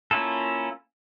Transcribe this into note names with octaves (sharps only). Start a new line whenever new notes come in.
A#3 C#4 E4 F4 A4